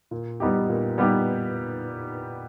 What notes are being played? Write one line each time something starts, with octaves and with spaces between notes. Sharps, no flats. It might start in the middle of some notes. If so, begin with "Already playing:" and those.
A#2
G3 B3 D#4 G4
A#2
G3 B3 D#4 G4